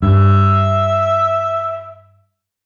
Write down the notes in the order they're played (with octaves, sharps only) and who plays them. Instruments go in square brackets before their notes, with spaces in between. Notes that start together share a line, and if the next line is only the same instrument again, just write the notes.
[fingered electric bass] G2 [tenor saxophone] E5